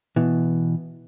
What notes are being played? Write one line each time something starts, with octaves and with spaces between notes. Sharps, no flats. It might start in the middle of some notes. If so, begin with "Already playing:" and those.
B2 E3